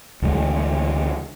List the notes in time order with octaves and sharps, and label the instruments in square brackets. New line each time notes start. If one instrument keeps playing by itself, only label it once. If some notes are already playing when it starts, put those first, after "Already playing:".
[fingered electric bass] D2 C#3 E3 G#3